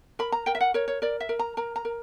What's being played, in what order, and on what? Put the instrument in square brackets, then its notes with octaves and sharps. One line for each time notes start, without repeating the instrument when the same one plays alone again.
[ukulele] A#4 B5
A#5
A#4 G5
E5
F#5
A#4 C#5
C#5
A#4 D5
E5
A#4
A#5
A#4 A#5
A#5
A#4